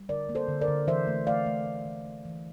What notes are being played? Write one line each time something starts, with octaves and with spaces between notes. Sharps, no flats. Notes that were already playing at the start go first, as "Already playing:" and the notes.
Already playing: G3
D3 A#4 D5
A#3
A4 C5
D3
A#4 D5
D3
E3 C5 E5
A3
A3 D5 F5
A3
A3
E3
A3
E3